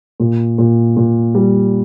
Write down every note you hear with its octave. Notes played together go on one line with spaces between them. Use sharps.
A#2
A#2
A#2
G3